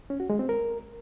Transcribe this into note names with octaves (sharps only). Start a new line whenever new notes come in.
C#4
F#4
G#3
C4
A#4